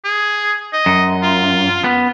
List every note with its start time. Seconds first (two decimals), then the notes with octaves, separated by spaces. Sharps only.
0.04 G#4
0.73 D#5
0.86 F#2
1.23 F4
1.84 B3